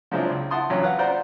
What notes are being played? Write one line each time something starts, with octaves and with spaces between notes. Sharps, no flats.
F3 F#3 G#3 C4 D4 E4
C#2
E4 F#5 A5 C6 D#6
E2 G2 F#3 C#4
B4 F5 F#5
F4 C5 D5 F#5 A#5